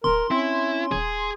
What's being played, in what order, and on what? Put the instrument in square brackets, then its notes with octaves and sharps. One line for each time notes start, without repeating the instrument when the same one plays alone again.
[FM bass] D1 [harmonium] A#4 [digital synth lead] C6
[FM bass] C4 [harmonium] C#4 [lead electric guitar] E4
[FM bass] D#1 [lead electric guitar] G#4